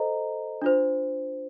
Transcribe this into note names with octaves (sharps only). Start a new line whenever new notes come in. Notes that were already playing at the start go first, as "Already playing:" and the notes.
Already playing: A4 C5 D#5 A#5
D4 F4 C5